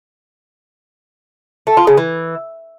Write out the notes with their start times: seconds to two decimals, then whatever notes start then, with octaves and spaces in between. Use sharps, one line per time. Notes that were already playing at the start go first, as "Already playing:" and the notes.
1.67 A3
1.77 F4
1.87 C#3
1.97 E3